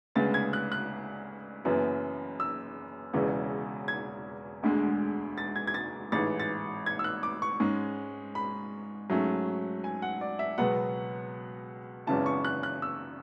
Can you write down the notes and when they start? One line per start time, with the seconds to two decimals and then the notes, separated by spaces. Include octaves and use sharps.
0.15 D2 C#3 G#3 B3 A6
0.34 G#6
0.53 F#6
0.72 F#6
1.65 F#1 F#2 E3 B3
2.40 E6
3.13 E1 E2 C#3 E3
3.88 G#6
4.63 E1 D2 D3 G#3
5.38 A6
5.56 G#6
5.67 G#6
5.74 A6
6.12 A1 G#2 E3 A6
6.40 A6
6.86 G#6
6.99 E6
7.04 F#6
7.23 D6
7.42 C#6
7.60 G#2 G#3 C#4
8.35 B5
9.10 G#2 F#3 A3 C#4
9.84 G#5
10.02 F#5
10.21 D5
10.39 E5
10.58 C#2 B2 F#3 B3 F#5
12.07 G#1 F#2 C#3 E3 B3 A5
12.26 C#6
12.44 F#6
12.63 F#6
12.82 E6